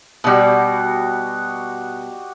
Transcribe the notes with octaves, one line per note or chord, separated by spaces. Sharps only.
B2 G3 F#4 G4 D#5